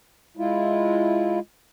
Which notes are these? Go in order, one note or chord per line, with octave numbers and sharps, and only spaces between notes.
G#3 E4 F4